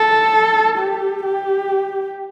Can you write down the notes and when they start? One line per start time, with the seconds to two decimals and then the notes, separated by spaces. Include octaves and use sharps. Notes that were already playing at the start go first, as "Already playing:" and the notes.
Already playing: A4
0.78 G4
1.24 G4